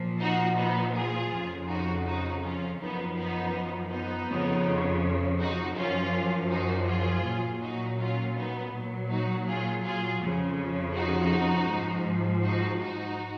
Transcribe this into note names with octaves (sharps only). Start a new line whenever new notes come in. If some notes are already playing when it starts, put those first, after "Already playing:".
Already playing: A#2 F3
D#4 F#4
B3 D#4
F4 G#4
F2 C#3 F3
D#4 F#4
D#4 F#4
C#4 F4
F#2 F3 B3 D#4
B3 D#4
B3 D#4
F2 C#3 F3
D#4 F#4
F#2 F3 C#4 F4
D#4 F#4
F4 G#4
A#2 F#3
D#4 F#4
C#4 F4
B3 D#4
A#2 F#3
D#4 F#4
F4 G#4
F4 G#4
F2 C#3 F3
D#4 F#4
G#2 F3
D#4 F#4
D#4 F#4